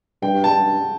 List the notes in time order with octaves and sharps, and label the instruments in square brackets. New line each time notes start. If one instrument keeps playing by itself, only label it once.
[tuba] G2 [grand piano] G5
[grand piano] A5
[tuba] G2